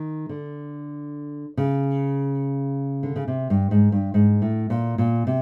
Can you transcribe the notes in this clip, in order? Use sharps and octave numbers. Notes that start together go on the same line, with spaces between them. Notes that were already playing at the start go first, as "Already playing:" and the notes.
Already playing: D#3
D3
C#3
D3
C#3
C3
G2
G#2
G2
G#2
A2
A#2
A#2
C3